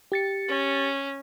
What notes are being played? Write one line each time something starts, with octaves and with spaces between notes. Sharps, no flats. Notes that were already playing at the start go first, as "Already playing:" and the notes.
G4 A6 C#7
C#4